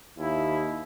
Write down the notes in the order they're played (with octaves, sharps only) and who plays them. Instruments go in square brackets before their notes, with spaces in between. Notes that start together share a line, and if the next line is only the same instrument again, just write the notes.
[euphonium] D#2 [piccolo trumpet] E4